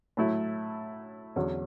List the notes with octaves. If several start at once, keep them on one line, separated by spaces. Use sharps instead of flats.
A2 F#3 A3 E4
E2 D3 F#3 C#4